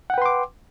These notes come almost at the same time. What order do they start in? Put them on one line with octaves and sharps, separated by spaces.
F#5 G5 B4 C6 D6